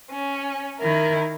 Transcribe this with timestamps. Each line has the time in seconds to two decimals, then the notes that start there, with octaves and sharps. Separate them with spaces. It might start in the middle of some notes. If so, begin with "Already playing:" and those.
0.10 C#4
0.78 D#3 E4 A#4